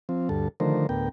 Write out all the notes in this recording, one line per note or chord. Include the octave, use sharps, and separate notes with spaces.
F3 C4
D2 G2 A4
D3 D#3 F3 A3 A#4 C5
D2 A2 B3 A#4 G5